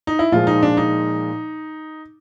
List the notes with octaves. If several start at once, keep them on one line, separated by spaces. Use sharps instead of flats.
D#4
E4
A#2 F3 G#3 F4
D#4
D4
D#4